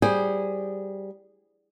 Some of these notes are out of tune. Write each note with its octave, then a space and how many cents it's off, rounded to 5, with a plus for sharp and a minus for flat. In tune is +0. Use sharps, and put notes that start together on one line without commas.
G3 -10 G#4 -15 C5 +0